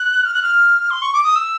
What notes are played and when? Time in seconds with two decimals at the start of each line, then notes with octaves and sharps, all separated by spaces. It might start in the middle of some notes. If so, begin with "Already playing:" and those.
Already playing: F#6
0.25 F6
0.34 F#6
0.42 F6
0.90 C6
1.02 C#6
1.13 D6
1.24 D#6
1.35 E6